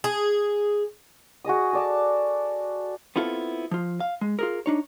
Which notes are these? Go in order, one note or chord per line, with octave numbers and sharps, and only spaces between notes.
G#4
F#4 G#4 D#5 D#6
A4 D5 A5
B3 C4 E4 F4 A4
F3 F4
F5
G#3
F4 G#4 A#4
D4 D#4 C#5